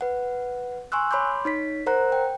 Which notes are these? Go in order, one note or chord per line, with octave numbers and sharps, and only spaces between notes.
B4 F#5
G#5 C6 C#6 E6 F#6
C#5 B5 C6 D6 G6
D#4 C#5 B6
A#4 C5 F#5 A#5 F#6
G5